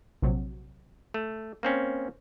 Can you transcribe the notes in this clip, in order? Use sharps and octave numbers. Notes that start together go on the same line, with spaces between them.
A#1 C3 F#3
A3
A#3 C4 C#4